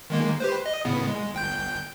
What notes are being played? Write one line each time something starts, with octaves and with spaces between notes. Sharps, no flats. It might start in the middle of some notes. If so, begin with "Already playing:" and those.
D#3 G#3 A#3
G4 B4 C5
D#5
A2 C#3 B3
G#3
G1 G5 G6